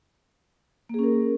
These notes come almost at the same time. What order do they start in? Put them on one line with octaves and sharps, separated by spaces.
A#3 G#4 C#4 A#4